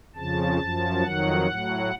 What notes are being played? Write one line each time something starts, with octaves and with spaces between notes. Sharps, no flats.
F2 C#3 F3 A5
F#2 F3
F2 D#3 F#3 F#5
A2 F#3